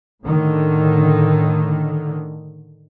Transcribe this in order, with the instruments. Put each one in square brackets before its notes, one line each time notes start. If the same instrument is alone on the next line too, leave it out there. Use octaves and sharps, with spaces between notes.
[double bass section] A2 D3 D#3